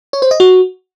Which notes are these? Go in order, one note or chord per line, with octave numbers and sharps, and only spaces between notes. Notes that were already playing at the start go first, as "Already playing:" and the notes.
C#5
C5
D#5
F#4